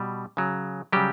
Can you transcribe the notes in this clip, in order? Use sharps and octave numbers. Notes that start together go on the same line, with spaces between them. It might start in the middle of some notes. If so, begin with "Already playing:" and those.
Already playing: B2 G3
C#3 F#3
C#3 F#3 G3 G4